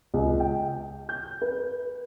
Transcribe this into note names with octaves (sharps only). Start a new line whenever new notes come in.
C#2
G5
G6
B4